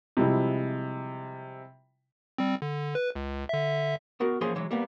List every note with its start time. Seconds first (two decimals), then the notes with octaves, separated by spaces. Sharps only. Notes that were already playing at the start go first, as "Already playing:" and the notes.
0.17 C3 F3 G3 G#3 E4
2.38 G3 C4
2.62 D3
2.95 B4
3.15 C#2
3.49 D3 E5
4.20 B3 F#4 A#4
4.41 E3 F3 A#3 C#4 G#4 C6
4.56 E3 F#3 G#3
4.71 G3 A#3 B3